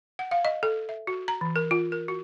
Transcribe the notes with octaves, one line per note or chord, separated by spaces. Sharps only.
F#5
F5
D#5
A4
E5
F#4
A#5
E3
A#4
F4
A#4
F#4